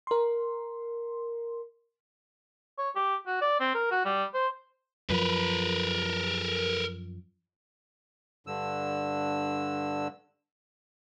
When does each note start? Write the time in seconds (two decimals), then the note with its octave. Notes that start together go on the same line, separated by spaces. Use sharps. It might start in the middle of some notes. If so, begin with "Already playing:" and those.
0.07 A#4 C6
2.79 C#5
2.96 G4
3.26 F#4
3.42 D5
3.60 C4
3.75 A#4
3.91 F#4
4.05 G3
4.34 C5
5.10 F#2 F3 A#4 B4
8.47 G2 D3 E6